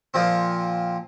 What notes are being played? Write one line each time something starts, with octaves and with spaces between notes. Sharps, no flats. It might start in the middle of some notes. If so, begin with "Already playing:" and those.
A#2 F3 C4